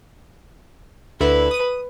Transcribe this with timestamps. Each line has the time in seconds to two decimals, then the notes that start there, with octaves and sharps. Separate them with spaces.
1.20 D2 D3 E4 B4
1.51 D#6 D#7